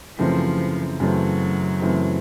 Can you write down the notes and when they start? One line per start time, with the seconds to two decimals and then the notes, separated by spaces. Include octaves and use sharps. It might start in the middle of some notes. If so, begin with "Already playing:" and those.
0.19 F#2 C#3 E3 F3 A3 C4
1.00 F#2 C#3 E3 F#3 A3 C4
1.81 F#2 C#3 E3 A3 C4